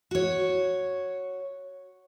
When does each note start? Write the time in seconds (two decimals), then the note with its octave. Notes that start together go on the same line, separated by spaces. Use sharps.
0.11 F#4 C#5